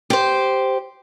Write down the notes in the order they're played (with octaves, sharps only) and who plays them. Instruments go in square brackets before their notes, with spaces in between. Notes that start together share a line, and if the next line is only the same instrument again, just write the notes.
[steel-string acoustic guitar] G4 C5